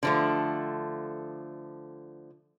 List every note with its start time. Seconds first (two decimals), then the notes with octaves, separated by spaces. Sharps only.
0.03 D3 F3 A3